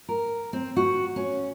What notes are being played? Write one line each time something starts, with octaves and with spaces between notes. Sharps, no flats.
A#4
C4
F#4
C#4